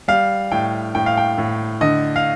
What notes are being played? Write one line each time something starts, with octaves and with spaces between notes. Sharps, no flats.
G3 F5
A2 G5
A2 G5
F5
G5
A2
D3 D#5
F5